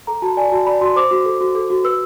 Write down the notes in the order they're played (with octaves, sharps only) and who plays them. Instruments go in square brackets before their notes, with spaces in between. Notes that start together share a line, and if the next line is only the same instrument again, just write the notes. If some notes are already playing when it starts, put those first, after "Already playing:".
[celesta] A4 A#5
F#4 A5
D5 G#5
F#4 A5
D5 B5
F#4 C6
C5 D6
F#4
A4
F#4
A4
F#4
B4 E6